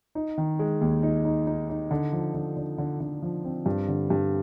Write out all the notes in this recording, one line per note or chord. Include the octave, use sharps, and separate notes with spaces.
D#4
D#3
G#3
D#2
D#4
D#4
D#4
D#4
D3
F3
D3
D3
D3
D3
F3
C4
G2
D3
G2